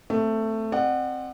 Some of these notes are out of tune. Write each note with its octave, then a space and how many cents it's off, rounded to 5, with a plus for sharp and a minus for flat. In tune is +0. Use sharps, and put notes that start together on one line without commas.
A3 +10 C4 -10
C4 +10 D5 +45 F#5 +0